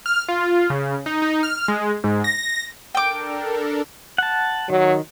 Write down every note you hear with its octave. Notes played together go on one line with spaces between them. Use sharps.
F6
F4
C#3
D#4
D#4
F6
G#3
G#2
A#6
D4 A4 A#4 G5 D6
F#5 A5
D#3 F#3